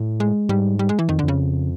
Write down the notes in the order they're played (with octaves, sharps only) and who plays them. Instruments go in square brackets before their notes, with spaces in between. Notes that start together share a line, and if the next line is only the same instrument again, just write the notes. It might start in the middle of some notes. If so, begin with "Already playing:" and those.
Already playing: [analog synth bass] A2
[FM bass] G#3
[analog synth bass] G#2 [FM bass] G3
[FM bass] G3
G#3
E3
[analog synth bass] F2 [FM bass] D#3
[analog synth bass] F2 [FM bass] D3
[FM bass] C#3